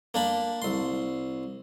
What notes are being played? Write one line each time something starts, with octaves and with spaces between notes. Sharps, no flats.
A#3 D4 B5
C2 C6